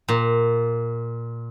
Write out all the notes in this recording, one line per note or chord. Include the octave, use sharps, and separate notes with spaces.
A#2